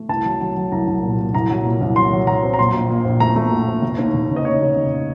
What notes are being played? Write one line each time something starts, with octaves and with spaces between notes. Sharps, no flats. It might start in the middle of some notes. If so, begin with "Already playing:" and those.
Already playing: A3
C2 A5
F#3
F#3
F#3
C2 A#5
C2
A#2
A#2
C2 A#5
F#3
A#2
C2
F#3 C6
F#3
F#3 A#5
C4
A#5
A#1 C6
A#1
A#2
A#1
A3 A#5
A3
A#1
A#1
F1
D#2
F1
C#3
D#5
D#2 C#5
C#3
F1